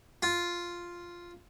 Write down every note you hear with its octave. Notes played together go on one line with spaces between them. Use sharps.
F4